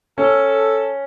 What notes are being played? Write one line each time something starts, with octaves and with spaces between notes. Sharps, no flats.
C#4 A4